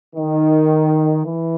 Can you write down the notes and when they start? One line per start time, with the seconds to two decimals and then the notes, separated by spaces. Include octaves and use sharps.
0.15 D#3
1.24 E3